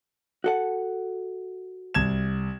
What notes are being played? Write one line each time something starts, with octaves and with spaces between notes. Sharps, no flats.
F#4 A4 F#5
C2 G#6 E7